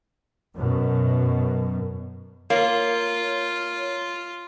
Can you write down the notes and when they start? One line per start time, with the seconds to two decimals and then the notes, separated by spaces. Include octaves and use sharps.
0.56 F#2 B2
2.50 A#3 F4 C#5